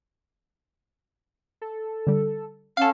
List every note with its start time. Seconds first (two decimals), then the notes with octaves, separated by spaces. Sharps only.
1.62 A4
2.07 D3 G3
2.77 C#4 A4 F5 F#5 A5